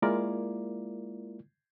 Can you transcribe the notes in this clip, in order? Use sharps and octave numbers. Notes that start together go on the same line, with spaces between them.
G#3 A#3 E4 F4 A#4 D5